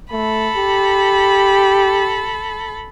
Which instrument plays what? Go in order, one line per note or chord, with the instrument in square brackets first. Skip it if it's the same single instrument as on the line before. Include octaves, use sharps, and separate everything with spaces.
[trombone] A3 [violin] A4 B5
[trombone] G4